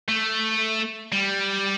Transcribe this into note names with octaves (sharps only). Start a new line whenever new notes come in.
A3
G3